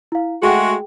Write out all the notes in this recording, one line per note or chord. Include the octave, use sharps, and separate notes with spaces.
E4 F5
G#3 A3 F#4 G#4 G5